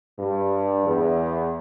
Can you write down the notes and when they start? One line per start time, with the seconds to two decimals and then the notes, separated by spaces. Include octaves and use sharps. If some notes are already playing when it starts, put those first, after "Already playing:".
0.18 G2
0.86 E2